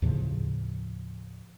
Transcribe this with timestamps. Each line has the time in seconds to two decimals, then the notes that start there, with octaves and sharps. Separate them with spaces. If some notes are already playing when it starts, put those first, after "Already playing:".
0.02 D#2 A2 C#3 F3